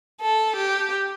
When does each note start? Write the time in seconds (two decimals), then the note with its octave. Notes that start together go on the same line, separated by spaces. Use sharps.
0.21 A4
0.56 G4